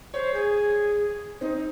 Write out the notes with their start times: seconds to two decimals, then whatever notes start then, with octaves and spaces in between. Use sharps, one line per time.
0.14 C5 C#5
0.34 G#4
1.41 C4 D#4